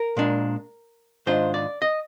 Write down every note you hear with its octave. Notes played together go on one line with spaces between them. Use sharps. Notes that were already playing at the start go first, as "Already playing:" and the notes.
Already playing: A#4
A#2 G#3 D4
G#2 D#3 G#3 D4 F4 C5
D5
D#5